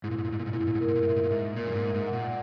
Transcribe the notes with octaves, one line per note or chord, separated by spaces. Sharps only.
G#2 E4
A#2
G#2
A#2
G#2 E4
A#2
G#2
A#2 E4
G#2
A#2
G#2
A#2 A#4
G#2
A#2
G#2
A#2 E5
G#2
A#2
G#2 E5
A#2 A#4
F#2
G#2
A#4
G#2
F#5
A#2